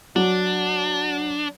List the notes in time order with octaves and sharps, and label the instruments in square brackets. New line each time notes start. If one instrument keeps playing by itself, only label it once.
[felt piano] F#3 [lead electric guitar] D4